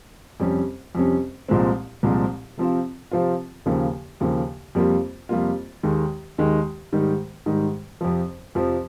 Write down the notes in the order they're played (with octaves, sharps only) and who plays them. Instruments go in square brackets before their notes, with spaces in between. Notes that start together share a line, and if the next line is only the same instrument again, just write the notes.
[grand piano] F2 C3 G3 C#4
F2 C3 G3 C#4
C2 A#2 F3 G#3 C4
C2 A#2 F3 G#3 C4
C3 F3 C4 F4
C3 F3 C4 F4
D#2 C#3 F3 A#3
D#2 C#3 F3 A#3
F2 C3 G3 A#3 F4
F2 C3 G3 A#3 F4
D#2 D#3 G#3
D#2 D#3 G#3
G#2 D#3 G3
G#2 D#3 G3
F2 C3 F3
F2 C3 F3